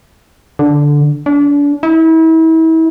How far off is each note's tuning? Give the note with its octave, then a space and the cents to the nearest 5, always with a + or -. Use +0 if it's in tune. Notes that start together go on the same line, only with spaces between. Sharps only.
D3 -5
D4 -35
E4 -35